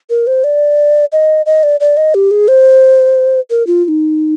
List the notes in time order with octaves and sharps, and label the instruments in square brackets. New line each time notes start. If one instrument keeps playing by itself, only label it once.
[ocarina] A#4
C5
D5
D#5
D#5
D5
D5
D#5
G4
G#4
C5
A#4
F4
F4
D#4